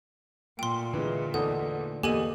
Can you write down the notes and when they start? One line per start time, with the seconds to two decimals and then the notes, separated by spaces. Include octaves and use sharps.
0.59 A#2 A3 G5 C6
0.94 D3 E3 G#3
1.34 E2 D#4 A4 D5 D#5 F#5
2.03 E2 A#3 G4 A4 D#5 G#5 D#7